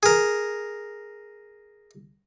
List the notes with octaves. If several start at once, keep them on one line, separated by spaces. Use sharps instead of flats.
G#4 A#4